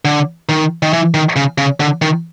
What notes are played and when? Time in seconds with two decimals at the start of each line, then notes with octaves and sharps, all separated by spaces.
0.05 D3
0.49 D#3
0.83 D#3
0.93 E3
1.14 D#3
1.36 C#3
1.58 C#3
1.80 D3
2.02 D#3